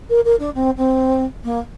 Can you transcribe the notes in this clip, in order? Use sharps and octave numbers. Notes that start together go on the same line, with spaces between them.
A#4
A#4
D4
C4
C4
A#3